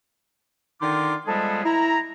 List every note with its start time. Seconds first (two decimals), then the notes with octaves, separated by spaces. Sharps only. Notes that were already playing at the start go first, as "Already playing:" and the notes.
0.81 D3 D#3 D#4 F4 C6 D6
1.26 F3 G3 G#3 B3 G#4 A4
1.65 E4 A#5